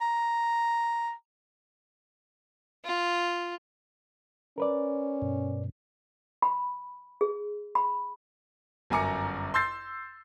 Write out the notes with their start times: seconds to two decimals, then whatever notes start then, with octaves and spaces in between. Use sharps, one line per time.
0.01 A#5
2.85 F4
4.58 C#4 A#4 B4 D5
5.22 G2 B2
6.42 B5
7.21 G#4
7.75 B5
8.90 G1 F#2 G#5 A#5 D6 C#7
9.54 C6 E6 G6 A6 C7